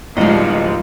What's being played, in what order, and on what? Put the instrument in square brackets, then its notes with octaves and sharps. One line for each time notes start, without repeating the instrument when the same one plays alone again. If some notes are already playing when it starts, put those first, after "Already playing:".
[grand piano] D1 A#5 [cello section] F3 G3 D#4 [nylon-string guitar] G#3 D#5